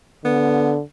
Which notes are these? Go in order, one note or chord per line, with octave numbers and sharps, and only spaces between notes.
D3 B3